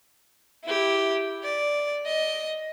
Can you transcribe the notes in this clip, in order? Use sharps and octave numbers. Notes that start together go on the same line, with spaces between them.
E4 G4
D5
D#5